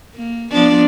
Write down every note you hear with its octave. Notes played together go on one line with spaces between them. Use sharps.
A#3
F3 B3 D4